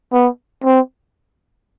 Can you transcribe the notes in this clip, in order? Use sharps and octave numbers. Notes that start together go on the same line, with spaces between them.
B3
C4